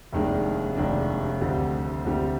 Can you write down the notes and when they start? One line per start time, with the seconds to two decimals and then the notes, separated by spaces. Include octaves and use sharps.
0.13 F1 D#2 D#3 G#3 D4
0.76 F1 D#2 D#3 G#3 D4
1.41 D2 D3 G3 C4
2.05 D2 D3 G3 C4